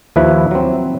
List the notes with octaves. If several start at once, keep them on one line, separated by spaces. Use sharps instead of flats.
D#2 F3 E4 B4 E5
F#3 C4